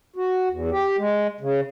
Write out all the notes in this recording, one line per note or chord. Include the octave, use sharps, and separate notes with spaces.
F#4
E2
G4
G#3
C#3